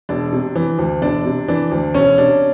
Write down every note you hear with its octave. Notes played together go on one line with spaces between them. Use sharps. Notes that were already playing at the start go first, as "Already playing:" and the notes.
E1 D4
C3
E3
D2
E1 D4
C3
E3 D4
D2
E1 C#4
C3 D4